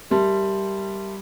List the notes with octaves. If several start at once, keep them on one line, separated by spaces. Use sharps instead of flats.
G3 G4 A#4 E5 A5 C6